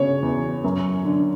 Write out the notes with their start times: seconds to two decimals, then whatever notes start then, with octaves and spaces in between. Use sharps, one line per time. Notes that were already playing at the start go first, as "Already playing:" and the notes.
Already playing: C#3 C#5
0.23 E2
0.64 F#2
1.05 D3